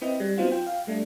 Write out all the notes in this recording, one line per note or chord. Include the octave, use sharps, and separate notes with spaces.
C4 E4 B4 D#5 G5
G3
F#3 B3 C4 D#4 F4 F#4
F4 G5
F5 G5
G3 A3 D4